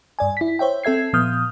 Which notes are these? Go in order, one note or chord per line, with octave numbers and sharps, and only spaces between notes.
G2 D5 G#5
E4 B6
C5 C#5 E5 G5
C4 A4 E5 G#6 C7
A#2 F3 B3 D#6 F6 G6